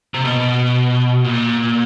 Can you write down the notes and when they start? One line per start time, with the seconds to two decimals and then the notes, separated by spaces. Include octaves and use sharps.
0.14 C3
0.25 B2
1.24 A#2